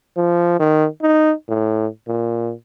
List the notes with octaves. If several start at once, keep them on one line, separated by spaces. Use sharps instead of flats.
F3
D#3
D#4
A2
A#2